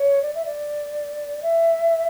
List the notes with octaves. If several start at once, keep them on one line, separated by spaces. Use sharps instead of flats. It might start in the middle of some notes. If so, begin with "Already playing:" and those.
Already playing: C#5
D5
E5
D5
E5